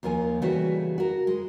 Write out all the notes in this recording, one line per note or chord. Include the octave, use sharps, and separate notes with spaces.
D#2 A#2 F3 A#4 G#5
C#3 E3 G3 A3 F#4 B4
F#4 A#4
G#3